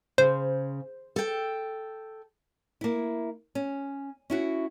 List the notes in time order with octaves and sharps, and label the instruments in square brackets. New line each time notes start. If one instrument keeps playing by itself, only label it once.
[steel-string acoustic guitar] C#3 [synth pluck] C5
[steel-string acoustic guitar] A4 G5
[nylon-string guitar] A#3 E4
C#4
C#4 E4 F#4